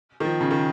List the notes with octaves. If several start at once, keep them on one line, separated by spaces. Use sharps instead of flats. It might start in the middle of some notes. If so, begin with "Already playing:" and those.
D#3
F3
C#3
D#3